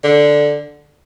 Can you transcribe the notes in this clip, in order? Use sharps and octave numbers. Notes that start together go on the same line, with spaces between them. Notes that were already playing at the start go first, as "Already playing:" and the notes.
D3